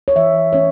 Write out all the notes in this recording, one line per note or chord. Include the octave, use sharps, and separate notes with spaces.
C#5
E3 E5
A3 C#4 C#5